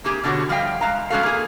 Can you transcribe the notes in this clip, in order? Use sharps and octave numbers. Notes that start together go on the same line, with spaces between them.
A#3 C4 G4 G#4
B2 D3 F#4 G4 C#5
F3 G3 D#5 F5 G5
G#3 F5 A#5
G3 G#3 C#4 F#4 A4 F5
A#3 G#4